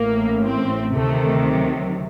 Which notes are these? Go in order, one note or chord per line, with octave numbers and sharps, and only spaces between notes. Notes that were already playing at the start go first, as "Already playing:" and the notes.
Already playing: A1 A2 A#3
C4
D2 C3 D#3 A3
F#3